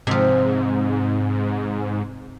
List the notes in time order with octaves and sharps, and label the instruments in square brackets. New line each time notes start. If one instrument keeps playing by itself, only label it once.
[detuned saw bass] G#2 [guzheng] C3 F3